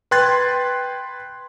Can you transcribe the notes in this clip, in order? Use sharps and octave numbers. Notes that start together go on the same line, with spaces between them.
B4 G5 C6 F#6 G#6 A6